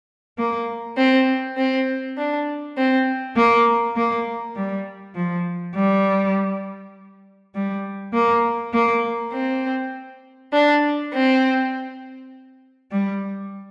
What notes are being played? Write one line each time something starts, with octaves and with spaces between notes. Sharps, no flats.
A#3
C4
C4
D4
C4
A#3
A#3
G3
F3
G3
G3
A#3
A#3
C4
D4
C4
G3